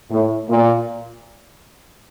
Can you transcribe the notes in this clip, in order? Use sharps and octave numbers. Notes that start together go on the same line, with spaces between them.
A2
A#2